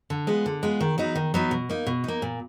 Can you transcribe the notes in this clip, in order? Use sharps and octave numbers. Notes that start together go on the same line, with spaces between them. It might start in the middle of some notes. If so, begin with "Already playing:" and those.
D3
G#3 B3 F4
D3
G#3 B3 F4
D#3
F#3 B3 D#4
D#3
F#3 B3 D#4
B2
A#3 D#4
B2
A#3 D#4
A#2